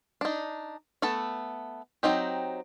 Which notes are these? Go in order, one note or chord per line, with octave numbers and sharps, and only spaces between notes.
D4 D#4
A3 B3 A4 A5
F#3 C4 D#4 G4